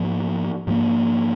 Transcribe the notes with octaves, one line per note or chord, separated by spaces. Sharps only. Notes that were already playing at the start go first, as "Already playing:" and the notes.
Already playing: G#2 F3 A#3
G#2 F3 A#3